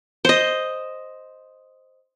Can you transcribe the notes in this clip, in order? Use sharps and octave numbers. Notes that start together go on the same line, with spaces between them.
C5 D#5